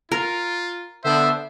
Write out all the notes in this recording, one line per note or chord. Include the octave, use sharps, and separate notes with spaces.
F4 A#4
D3 B3 D4 C5 E5